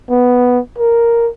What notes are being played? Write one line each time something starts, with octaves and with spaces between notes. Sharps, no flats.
B3
A#4